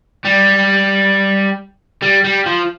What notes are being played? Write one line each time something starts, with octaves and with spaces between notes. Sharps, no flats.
G3
G3
G3
F3